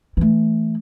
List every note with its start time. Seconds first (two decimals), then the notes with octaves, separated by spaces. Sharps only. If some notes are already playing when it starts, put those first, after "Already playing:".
0.17 E3 A3